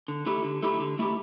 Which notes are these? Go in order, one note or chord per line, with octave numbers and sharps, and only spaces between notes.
D3
A3 E4 G4
D3
A3 E4 G4
D3
A3 E4 G4